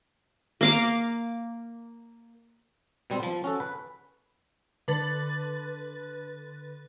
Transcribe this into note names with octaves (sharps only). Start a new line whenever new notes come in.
A#3 F5 D6
B2 G3 C4
F3
C#4 F#4 A4
B4
D3 B4 A6